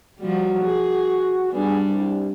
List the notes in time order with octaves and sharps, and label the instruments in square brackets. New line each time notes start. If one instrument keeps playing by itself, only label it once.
[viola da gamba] F3 G3 [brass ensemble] F#4
[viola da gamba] G#4
[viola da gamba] G3 D4 [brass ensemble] B3 G#4
[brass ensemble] C2